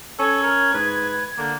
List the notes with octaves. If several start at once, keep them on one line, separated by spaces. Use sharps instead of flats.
C#4 A4 G#6
A#4
G#2 B4
D3 A#3